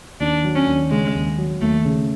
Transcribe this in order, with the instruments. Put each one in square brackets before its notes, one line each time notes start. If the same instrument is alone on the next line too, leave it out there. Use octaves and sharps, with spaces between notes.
[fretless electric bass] D#2 [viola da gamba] D4
[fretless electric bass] F#3
[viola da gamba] C#4
[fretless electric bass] D#2
[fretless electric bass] C#3 [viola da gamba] G#3
[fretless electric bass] D#2
F#3
[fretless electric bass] D#2 [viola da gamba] A3
[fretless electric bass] C#3